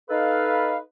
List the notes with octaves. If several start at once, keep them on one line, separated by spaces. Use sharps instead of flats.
D#4 A4 B4 F5